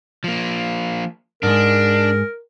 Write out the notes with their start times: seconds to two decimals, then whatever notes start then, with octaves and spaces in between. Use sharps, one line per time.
0.24 F3 A#3
1.43 G#2 G#3 D4 A#4